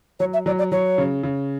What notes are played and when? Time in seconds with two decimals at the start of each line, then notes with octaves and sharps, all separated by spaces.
0.20 F#3 C#5
0.33 E5
0.46 F#3 D5
0.58 D5
0.72 F#3 C#5
0.98 C#3
1.23 C#3